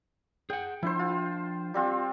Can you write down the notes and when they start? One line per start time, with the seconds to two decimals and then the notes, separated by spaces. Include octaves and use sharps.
0.50 G#4 F#5 G5
0.83 F3 D4 E4 C5
0.99 F4
1.74 G3 C4 F4